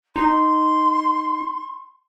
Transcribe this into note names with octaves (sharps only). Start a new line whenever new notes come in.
D#4 C6